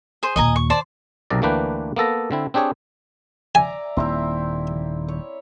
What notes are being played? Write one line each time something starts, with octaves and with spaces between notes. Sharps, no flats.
G#4 C5
D#2 A#2 D#5 G#5 A#5
C#6
C5 D5 A5
B1 C3 A#4 D5
D2 E3 A#3 D4 B4 G5
A#3 B3 A4 A#5
D3 C4 E4
C4 D4 G4 G#4 C#5
D5 E5 G#5 A#5
D#1 D#2 C4 E4 E5
C#5